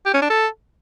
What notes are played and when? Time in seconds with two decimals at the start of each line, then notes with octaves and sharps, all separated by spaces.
0.06 G4
0.14 C#4
0.22 D4
0.30 A4